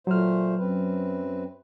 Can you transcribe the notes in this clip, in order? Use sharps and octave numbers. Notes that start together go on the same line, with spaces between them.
A#2 F#3 A3 C5 F6
F#2 C4 B4